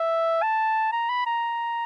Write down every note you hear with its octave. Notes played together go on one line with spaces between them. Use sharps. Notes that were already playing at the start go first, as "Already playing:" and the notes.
Already playing: E5
A5
A#5
B5
A#5